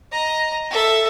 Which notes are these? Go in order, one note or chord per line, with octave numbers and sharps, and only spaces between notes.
D#5 A#5
A4 E5